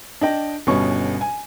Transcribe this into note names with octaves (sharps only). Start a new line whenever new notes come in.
D4 D#5 G5
G1 B2 C#4 C#6
G#5